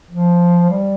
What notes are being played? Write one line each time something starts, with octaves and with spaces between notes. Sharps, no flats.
F3
G3